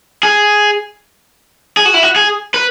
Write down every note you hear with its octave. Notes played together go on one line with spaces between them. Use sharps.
G#4
G#4
F#4
E4
F#4
G#4
B4